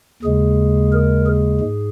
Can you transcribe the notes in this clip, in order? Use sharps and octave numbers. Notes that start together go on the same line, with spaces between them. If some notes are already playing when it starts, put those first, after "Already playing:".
D#2 C#3 G#3 G#4
A#4
G#4
G#2